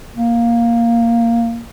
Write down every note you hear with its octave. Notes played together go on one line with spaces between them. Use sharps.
A#3